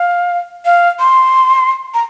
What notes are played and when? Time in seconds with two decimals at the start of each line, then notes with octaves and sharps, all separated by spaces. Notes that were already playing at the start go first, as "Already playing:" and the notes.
Already playing: F5
0.65 F5
0.99 C6
1.94 A#5